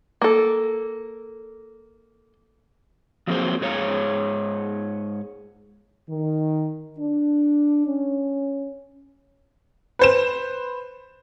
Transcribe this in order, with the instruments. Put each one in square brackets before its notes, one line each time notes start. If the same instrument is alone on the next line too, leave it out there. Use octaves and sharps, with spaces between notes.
[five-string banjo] A#3 A4
[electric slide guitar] F3 F#3 A#3 C4 G#4 C5
G#2 G#4 C#5 F5 A#5
[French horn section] D#3
D4
C#4
[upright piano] B4 C5 E7